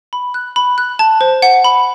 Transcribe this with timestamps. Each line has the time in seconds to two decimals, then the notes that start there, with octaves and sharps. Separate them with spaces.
0.13 B5
0.34 F#6
0.56 B5
0.78 F#6
0.99 A5
1.21 C5
1.42 F#5
1.64 B5